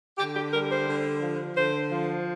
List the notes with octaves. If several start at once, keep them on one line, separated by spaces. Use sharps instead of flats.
D3 G4
G4
G3 A#4
C5
D3
F3
D3 C5
F3